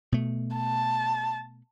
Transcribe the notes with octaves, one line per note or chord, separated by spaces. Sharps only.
B2 A3
A5